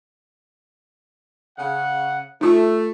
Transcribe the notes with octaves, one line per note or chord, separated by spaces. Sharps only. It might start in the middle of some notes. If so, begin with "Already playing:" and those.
C#3 F#5
A3 D#4 F4